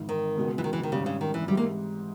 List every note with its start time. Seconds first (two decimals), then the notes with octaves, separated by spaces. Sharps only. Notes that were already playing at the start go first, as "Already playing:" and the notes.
Already playing: G#1 G#2 E3
0.09 D#3
0.36 C#2 B2 G#3
0.58 E3
0.64 D#3
0.73 E3
0.83 D#3
0.92 G#1 G#2 C#3 G3 C#4 G4
1.06 C#3
1.21 D#3
1.34 E3
1.48 G#2 E3 G3 G#3 D#4 G4
1.57 A#3